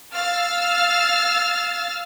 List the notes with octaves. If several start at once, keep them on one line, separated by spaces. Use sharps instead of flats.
F5 E6 F6 A6